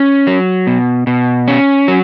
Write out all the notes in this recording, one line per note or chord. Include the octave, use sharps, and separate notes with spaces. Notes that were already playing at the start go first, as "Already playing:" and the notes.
Already playing: C#4
F#3
B2
B2
C#4
F#3